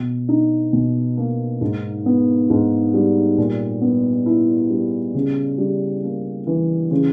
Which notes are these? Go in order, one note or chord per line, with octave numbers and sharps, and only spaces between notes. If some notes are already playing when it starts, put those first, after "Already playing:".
Already playing: B2
D#4
B2
A#3
G#2
B3
G#2
G3
A#2
B3
E4
G3
C#3
G3
A#3
E3
C#3